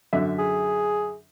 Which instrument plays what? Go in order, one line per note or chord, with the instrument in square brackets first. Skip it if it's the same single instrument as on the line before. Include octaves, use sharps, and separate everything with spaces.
[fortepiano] F#2 D3 E5
[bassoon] G#4